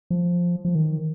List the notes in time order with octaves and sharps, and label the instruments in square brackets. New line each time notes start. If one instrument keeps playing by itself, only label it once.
[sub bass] F3
F3
D#3